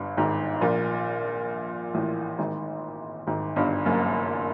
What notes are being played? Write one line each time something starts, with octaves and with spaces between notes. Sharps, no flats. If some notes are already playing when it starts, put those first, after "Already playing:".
Already playing: G1 G2
G#1 G#2
A#1 A#2
A1 A2
G#1 G#2
G#1 G#2
G1 G2
F#1 F#2